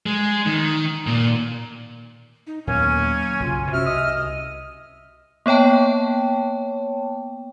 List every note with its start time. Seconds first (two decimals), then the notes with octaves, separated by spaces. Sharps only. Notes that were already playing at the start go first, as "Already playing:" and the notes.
0.06 G#3
0.46 D#3
1.07 A#2
2.47 D#4
2.67 D#2 A#2 F#3 A#3 B3 C#4 G#5
3.40 B1 F#2 C#3 F4
3.72 C3 C#4 F#4 E5 E6 F6
3.86 C2 D#5 D#6
5.46 A#3 B3 C#5 G5 A5